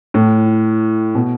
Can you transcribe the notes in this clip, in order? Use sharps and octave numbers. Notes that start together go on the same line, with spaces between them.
A2
B2